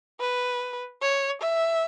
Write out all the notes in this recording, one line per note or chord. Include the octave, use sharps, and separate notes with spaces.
B4
C#5
E5